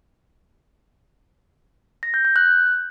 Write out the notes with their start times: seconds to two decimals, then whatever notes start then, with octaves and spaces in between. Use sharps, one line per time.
2.03 A#6
2.14 G6
2.25 G6
2.36 F#6